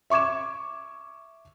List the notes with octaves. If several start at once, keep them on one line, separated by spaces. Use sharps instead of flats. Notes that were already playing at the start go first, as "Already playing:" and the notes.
E5 C#6 D6 G#6 E7